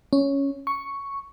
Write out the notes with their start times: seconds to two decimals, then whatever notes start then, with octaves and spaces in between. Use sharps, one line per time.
0.13 C#4
0.67 C#6